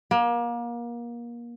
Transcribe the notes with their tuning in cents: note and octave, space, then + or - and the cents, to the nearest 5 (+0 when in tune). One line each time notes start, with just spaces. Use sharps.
A#3 +30